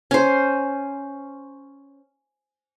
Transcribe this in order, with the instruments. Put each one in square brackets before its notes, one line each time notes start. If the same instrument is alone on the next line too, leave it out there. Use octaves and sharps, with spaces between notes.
[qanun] C#4 C5